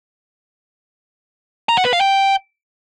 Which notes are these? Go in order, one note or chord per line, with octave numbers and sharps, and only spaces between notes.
A#5
F#5
B4
F5
G5